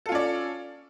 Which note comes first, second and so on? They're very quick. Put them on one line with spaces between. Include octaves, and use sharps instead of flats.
A4 F4 C#4 D5